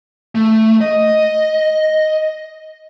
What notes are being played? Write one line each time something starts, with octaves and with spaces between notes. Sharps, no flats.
A3
D#5